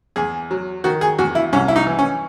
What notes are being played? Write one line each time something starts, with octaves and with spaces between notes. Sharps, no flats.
E2 G#4
F#3
D#3 F#4
G#4
E2 F#4
E4
C2 C#4
E4
D#4
E3
C#4